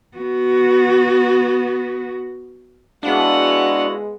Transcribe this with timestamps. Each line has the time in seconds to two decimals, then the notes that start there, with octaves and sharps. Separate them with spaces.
0.17 B3 F#4
3.03 G#3 B3 D4 E4 F#4 F5 F#5